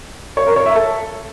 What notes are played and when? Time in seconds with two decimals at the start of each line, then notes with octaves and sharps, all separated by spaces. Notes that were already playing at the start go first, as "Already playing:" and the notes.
0.37 C#5
0.47 A#4
0.56 C#5
0.66 E5
0.76 A4